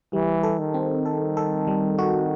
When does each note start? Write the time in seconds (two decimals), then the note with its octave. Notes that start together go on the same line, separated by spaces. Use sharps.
0.13 E3 G3
0.43 A4
0.59 D#3
0.74 C4
1.05 A4
1.37 A4
1.67 G3
1.98 F#4